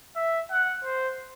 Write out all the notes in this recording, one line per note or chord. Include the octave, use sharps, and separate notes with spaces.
E5
F#5
C5